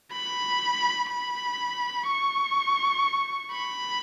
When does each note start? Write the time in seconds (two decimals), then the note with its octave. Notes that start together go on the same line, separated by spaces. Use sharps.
0.12 B5
1.09 B5
2.07 C#6
3.52 B5